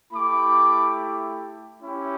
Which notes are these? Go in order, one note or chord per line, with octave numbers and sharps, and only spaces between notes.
A3 E4 G4 B5 D6
C#4 E4 G4